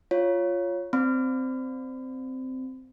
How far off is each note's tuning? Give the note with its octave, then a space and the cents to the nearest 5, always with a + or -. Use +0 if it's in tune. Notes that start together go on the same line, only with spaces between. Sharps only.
F4 +0 C#5 +0
C4 -10 D5 +0 B5 +35